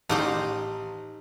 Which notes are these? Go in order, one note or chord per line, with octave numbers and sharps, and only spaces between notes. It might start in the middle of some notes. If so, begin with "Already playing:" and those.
A1 D#4 G4 C5